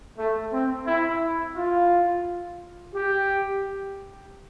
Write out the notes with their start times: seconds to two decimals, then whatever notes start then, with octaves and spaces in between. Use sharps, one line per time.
0.18 A3
0.52 C4
0.87 E4
1.56 F4
2.94 G4